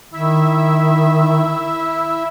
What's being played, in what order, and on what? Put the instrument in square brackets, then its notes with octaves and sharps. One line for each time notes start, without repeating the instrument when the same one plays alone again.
[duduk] D#3 [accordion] E4 E5